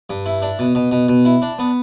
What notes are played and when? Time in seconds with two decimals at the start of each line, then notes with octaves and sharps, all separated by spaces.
0.10 G2
0.26 E4
0.42 D4
0.59 B2
0.75 B2
0.92 B2
1.09 B2
1.25 E4
1.42 D4
1.59 B3